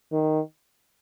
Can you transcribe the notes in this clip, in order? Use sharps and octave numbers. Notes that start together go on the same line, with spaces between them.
D#3